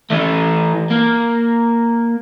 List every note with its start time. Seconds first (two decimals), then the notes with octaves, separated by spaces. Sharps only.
0.10 E3 A3
0.90 A#3